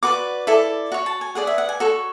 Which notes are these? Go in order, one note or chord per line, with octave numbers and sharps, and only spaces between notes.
F#4 B4 D5 D6
E4 A4 D5
F#4 C#5
A5
G#5
G#4 B4 D5 F#5
E5
F#5
G#5
F#4 A4 C#5